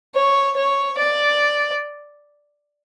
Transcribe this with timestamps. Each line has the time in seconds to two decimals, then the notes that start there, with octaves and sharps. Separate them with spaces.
0.15 C#5
0.57 C#5
0.98 D5